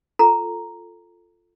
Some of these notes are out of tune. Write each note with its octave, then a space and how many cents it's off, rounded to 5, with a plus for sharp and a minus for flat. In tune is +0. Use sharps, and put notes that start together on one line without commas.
F4 +0 A4 +0 A#5 +0